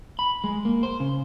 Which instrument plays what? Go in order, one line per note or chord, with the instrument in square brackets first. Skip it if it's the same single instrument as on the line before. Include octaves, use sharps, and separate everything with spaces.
[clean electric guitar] B5
G#3
A#3
C5
C#3